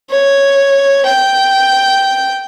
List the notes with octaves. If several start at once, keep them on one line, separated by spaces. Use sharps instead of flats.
C#5
G5